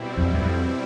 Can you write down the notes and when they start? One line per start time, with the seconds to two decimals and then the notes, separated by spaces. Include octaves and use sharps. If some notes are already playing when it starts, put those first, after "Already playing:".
Already playing: B2 G3 C4 E4
0.18 F2
0.34 E2
0.42 F2